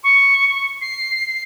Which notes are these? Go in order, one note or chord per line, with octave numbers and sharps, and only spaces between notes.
C#6
C7